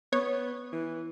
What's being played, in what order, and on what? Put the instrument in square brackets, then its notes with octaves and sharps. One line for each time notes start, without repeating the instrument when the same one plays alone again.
[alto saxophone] B3 [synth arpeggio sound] C#5
[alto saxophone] E3